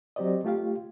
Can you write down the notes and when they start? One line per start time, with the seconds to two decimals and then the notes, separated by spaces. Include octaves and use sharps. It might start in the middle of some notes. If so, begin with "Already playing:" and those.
0.16 F#3 C4 G4 C5 D5 D#5
0.45 A3 F4 G4 F5